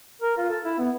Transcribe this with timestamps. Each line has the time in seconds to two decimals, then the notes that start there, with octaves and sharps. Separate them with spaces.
0.22 A#4
0.38 F4
0.49 A4
0.65 E4
0.78 B3